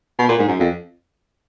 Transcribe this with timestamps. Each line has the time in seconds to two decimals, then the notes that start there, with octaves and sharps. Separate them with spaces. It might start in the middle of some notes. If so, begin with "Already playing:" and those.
0.18 B2
0.29 A#2
0.39 G#2
0.48 F#2
0.60 F2